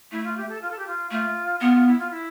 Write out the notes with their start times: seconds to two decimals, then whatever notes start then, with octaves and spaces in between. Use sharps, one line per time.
0.11 A3 E4
0.24 F4
0.37 G4
0.48 A4
0.61 F4
0.70 A4
0.78 G4
0.86 F4
1.10 A3 F4
1.61 B3 F4
1.73 F4
1.86 E4
1.98 F4
2.10 E4